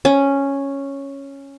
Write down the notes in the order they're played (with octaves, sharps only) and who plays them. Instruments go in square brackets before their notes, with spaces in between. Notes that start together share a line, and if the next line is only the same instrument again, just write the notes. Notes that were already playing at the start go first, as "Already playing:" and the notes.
[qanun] C#4